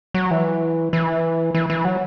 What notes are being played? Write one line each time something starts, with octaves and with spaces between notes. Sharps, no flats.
F#3
E3
E3
E3
E3
F#3